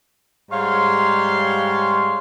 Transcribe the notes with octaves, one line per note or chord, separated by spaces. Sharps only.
G#2 G3 C#5 F5 C6